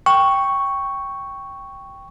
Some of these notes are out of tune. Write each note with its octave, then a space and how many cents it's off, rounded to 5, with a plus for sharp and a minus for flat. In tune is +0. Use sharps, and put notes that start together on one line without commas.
G5 +0 C#6 +0